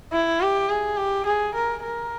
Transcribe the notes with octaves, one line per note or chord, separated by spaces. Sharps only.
E4
G4
G#4
G4
G#4
A#4
A#4